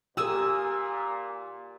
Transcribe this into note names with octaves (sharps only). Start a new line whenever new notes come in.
A#2 G4 G#4 A#4 G#5 D#6 E6